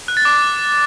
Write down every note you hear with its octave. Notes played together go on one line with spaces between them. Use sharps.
F#6
A6
D6